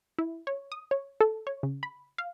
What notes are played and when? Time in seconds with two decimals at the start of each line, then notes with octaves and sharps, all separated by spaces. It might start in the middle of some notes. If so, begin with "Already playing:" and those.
0.19 E4
0.47 C#5
0.72 D#6
0.91 C#5
1.21 A4
1.47 C#5
1.63 C#3
1.83 B5
2.18 F5